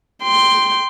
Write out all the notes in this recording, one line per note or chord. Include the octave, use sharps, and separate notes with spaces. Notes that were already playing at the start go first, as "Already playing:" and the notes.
G5 C6